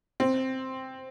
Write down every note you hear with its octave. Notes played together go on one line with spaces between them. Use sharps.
C4